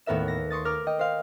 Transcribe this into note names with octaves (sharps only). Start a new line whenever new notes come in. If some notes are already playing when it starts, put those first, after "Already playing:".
D#2 A2 B3 A#4 E5 E7
A#6
C6 C#6 D#6 A6
A#4 D6 F6
D#5 G5
C5 F5